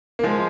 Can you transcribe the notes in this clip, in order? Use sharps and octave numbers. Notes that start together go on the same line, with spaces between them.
A#3
F3 G#3